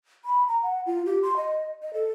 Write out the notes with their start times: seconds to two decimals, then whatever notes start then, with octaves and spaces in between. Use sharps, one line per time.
0.25 B5
0.48 A#5
0.63 F#5
0.86 F4
1.06 G4
1.23 C6
1.36 D#5
1.82 D#5
1.94 A4